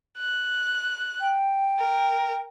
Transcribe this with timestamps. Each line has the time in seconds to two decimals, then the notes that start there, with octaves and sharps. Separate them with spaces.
0.18 F#6
1.21 G5
1.79 A#4